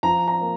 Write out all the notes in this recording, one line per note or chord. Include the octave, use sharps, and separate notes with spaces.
F3 A#5
A#5
A#3